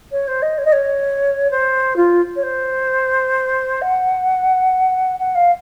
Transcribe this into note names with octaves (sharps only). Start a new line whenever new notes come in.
C#5
C5
D#5
C#5
D#5
C#5
C5
F4
C#5
C5
F#5
F#5
F5